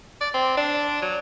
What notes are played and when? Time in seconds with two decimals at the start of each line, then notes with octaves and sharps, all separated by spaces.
0.21 D5
0.34 C4
0.57 D4
1.02 F#3